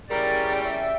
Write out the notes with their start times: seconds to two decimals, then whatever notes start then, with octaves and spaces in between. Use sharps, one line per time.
0.10 C#3 E3 G3 C#4 A#4 D5 G5
0.64 E5